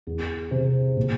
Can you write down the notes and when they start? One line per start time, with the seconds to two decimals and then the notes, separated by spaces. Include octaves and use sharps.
0.07 E2
0.51 C3
0.97 A#2